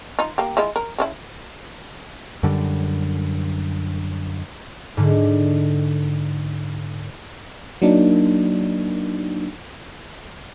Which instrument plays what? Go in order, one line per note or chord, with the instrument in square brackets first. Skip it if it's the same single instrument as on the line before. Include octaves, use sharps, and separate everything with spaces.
[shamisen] D#4 F4
A#3 G4
G#3 E4 F4
A#4
C#3 C#4 E4
[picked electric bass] F#2 D3 G3
[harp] G#2 D3
[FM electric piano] F#3 A#3 D4 D#4